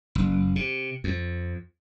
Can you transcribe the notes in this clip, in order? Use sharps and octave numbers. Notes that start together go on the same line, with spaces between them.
F#1
C3
F2